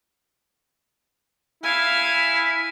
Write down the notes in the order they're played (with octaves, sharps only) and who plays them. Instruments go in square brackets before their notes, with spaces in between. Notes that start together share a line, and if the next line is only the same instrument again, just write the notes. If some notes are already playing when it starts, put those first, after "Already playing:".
[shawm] E4 [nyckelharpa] F5 G#5